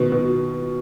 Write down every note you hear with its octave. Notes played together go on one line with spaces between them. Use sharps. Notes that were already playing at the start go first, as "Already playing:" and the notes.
Already playing: B2 D#3
B2